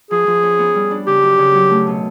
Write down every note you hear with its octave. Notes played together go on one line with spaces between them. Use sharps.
F3 G#4
F3
C#4
B3
G3
D4
C#3 G4
F#2
C#3
F#3
A3
B2